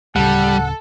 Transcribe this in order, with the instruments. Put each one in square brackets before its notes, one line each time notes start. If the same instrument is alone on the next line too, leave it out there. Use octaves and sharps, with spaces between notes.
[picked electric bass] D1 C#3 [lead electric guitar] G3 [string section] A4 [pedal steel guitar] F#5